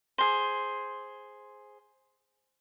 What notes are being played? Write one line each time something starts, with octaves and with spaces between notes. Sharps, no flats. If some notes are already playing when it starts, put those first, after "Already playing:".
G#4 C5